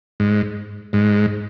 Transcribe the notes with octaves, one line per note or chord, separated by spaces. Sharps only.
G#2
G#2